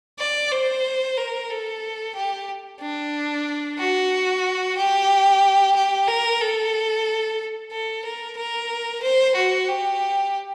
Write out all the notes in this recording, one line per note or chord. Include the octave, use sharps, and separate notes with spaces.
D5
C5
A#4
A4
G4
D4
F#4
G4
G4
A#4
A4
A4
A#4
A#4
C5
F#4
G4